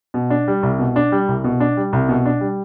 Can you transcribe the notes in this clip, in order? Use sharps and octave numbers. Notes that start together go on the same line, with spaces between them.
B2
D4
G3
C2
B2
D4
G3
C2
B2
D4
G3
C2
B2
D4
G3